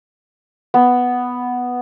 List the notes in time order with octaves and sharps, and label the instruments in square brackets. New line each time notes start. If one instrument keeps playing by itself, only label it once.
[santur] B3